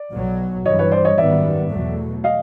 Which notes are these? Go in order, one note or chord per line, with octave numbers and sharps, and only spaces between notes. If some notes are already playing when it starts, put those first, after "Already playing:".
Already playing: D5
B1 B2 F#3
G2 E3 G3 C#5 D#5
B4 C#5
C5 D5
C#5 D#5
G#1 F#2 D#3 G3 B3 D5 E5
E2 B2 F#3 A3
D#5 F5